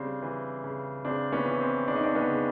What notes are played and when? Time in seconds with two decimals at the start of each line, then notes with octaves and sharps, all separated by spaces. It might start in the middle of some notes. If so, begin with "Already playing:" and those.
Already playing: C#3 G3 C4 D4
0.22 E3
0.64 C#3
1.05 C#3 C4 D4
1.33 B3 C#4
1.46 E3
1.60 C4
1.88 C#3 D4
1.96 D#4
2.04 C4 D4
2.15 B3 C#4
2.29 C#3